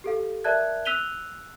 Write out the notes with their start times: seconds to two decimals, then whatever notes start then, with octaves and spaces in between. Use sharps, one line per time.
0.04 G4 A4 F5
0.44 A#4 D5 E5 A5 F#6 G#6
0.85 E6 F#6 B6 D#7 F7 G7